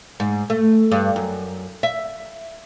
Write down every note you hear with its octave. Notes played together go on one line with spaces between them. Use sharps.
G#2
A3
G2
F#2
E5